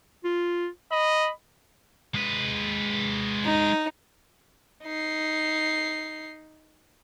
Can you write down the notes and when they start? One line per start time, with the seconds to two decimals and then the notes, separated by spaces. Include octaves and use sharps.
0.24 F4
0.91 D#5 B5
2.15 G#3 B4
3.44 D#4
4.85 D#4 C7